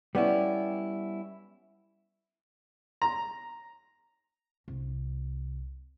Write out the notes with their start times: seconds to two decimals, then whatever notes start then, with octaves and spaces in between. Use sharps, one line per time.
0.15 G3 B3 C#4 E4
3.02 A#5
4.68 C2